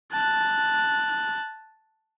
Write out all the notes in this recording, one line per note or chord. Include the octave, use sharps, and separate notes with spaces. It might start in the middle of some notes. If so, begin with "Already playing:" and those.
A5 F#6